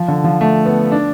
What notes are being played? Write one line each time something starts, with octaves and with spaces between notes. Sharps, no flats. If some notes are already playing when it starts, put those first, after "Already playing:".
Already playing: F3
D3
F3
A3
B3
D4